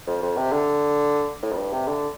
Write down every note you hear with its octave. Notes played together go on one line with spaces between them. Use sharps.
F2
F2
C3
D3
A2
F2
G2
C3
D3